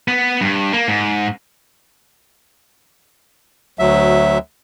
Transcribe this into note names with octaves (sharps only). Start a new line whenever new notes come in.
B3
G2
A#3
G#2
D2 F#3 E5